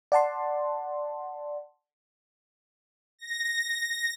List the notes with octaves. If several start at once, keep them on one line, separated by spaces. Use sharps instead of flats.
D5 F#5 A5 C6
A#6